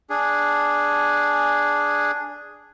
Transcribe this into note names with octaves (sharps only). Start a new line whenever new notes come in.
D4 G#4